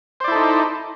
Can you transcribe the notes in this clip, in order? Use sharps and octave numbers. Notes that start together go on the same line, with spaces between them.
D#4 E4 A4 C5 D5